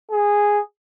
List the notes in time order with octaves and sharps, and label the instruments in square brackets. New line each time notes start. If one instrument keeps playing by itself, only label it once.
[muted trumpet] G#4